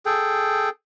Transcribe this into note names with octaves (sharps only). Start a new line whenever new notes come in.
G#4 A4 G5